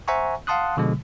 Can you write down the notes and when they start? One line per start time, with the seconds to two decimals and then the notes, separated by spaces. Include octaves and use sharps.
0.08 C5 E5 F#5 G#5 A#5 C#6
0.47 F5 F#5 A5 C6 D#6 F#6
0.77 B2 D3 F3 G#3